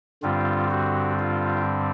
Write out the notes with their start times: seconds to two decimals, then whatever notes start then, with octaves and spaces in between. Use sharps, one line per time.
0.22 G2 D3 G3 C4 F4
0.70 F#4
1.19 F4